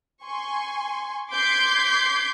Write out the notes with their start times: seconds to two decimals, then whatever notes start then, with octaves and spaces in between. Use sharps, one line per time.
0.24 G#5 C6 C#6
1.31 C6 D6 G6 G#6 B6 C7